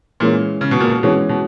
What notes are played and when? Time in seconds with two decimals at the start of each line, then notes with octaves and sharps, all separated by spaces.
0.20 A#2 E3 G#3 C#4
0.61 C#3
0.71 B2
0.80 A#2
0.90 B2
1.03 B2 E3 G#3 C#4
1.29 B2